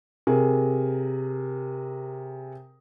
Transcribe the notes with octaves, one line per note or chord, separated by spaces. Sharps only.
C3 G#4 A#4